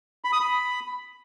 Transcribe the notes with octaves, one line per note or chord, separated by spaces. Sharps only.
B5
D#6
B5